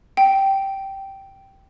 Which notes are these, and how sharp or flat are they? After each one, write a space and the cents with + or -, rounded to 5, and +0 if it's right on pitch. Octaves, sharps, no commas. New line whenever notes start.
G5 -10